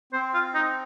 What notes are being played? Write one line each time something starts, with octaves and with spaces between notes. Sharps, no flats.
C4 C5
F4
D#4